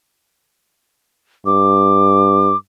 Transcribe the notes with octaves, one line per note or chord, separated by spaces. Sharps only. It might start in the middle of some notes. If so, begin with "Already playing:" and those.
G2 D6